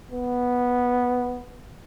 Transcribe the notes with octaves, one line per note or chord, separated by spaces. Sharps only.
B3